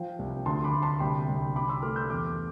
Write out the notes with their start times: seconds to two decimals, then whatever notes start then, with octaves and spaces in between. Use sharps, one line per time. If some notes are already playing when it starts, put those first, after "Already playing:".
Already playing: F3 G5
0.19 C2
0.46 D2 A5 C6
0.64 B5 D6
0.74 D2
0.82 A5 C6
1.00 C2 G5 B5
1.28 C2
1.55 C3 B5 D6
1.69 C6 E6
1.82 A3 D6 F6
1.96 E6 G6
2.10 E2 D6 F6